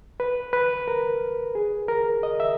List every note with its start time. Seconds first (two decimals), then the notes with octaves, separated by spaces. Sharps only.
0.20 B4
0.53 B4
0.88 A#4
1.55 G#4
1.88 A#4
2.23 D#5
2.40 E5